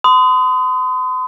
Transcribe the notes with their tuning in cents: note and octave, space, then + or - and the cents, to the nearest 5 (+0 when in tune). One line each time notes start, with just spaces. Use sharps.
C6 -45 D#6 +0